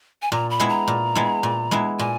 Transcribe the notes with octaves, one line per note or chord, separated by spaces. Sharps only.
G#5
A#2 A#5
B5
G#3 B3 E4
A#5
A#2
G#3 B3 E4
A#2
G#3 B3 E4
A#2 G#5